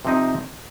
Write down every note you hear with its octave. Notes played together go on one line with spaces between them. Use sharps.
C3 F3 C4 D#4